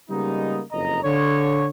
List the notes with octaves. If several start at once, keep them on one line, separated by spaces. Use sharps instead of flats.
C#3 G3 G#3 A#3 B3 D#4
F#1 F2 D#5 A#5
D3 C#5